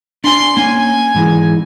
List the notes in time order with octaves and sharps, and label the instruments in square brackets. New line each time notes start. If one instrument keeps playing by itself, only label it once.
[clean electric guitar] D4 G#5 [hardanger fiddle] C6
[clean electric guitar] A#3 C#4 [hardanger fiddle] G#5
[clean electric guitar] G#2 E3 G#3